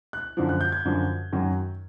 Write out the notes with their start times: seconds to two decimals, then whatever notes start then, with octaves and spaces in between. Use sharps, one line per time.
0.13 F#6
0.37 F#2 D3 F3
0.49 F#6
0.61 G6
0.72 G#6
0.85 F#2 D3 F3
1.32 F#2 D#3 F#3